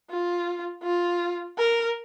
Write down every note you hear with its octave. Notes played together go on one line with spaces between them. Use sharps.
F4
F4
A#4